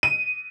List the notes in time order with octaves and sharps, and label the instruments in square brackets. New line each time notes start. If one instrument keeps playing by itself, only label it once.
[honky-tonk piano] D#7